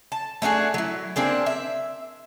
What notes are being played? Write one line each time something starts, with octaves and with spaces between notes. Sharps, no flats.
A5
A3 D4 F#4 G#4
F#3 E4
A#3 C4 D4 G#4
E5